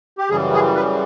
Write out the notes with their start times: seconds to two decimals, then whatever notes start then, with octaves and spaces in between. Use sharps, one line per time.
0.18 G4
0.30 F#2 C#3 E3 G3 G#4
0.53 G#4
0.76 B4